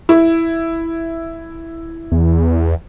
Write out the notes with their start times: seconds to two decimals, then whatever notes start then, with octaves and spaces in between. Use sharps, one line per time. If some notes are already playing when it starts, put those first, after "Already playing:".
0.09 E4
2.12 E2